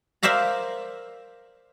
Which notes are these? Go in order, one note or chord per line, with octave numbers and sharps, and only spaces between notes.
A#4 C5 D5 E5 F5 A#5